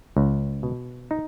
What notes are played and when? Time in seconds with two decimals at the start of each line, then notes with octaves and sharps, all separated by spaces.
0.17 C#2
0.63 B2
1.11 D#4